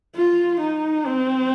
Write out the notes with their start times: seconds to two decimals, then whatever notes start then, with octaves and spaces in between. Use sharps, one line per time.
0.15 F4
0.60 D#4
1.06 C4